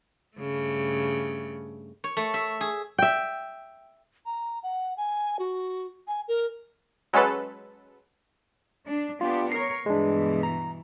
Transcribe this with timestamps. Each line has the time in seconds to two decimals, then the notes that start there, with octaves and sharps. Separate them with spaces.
0.37 G2 C#3 A3
2.04 C#5
2.17 A3
2.34 E5
2.61 G#4
2.99 E5 G5
4.26 A#5
4.63 F#5
4.97 G#5
5.39 F#4
6.08 G#5
6.28 A#4
7.13 F#3 G#3 C#4 A4 B4
8.86 D4
9.21 B3 D4 F4 G4
9.52 A#4 C#5 C7
9.86 G2 B2 E3 G#3 D4
10.43 A#5